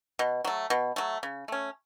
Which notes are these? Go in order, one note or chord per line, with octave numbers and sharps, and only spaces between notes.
B2
F#3 A3
B2
F#3 A3
C#3
A3 C#4